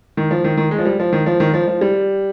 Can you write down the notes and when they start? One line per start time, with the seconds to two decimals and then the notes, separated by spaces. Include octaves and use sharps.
0.17 D#3
0.31 F3
0.44 D#3
0.57 D#3
0.71 G#3
0.79 F3
0.85 G3
1.00 F3
1.13 D#3
1.26 F3
1.40 D#3
1.54 F3
1.68 F3
1.81 G3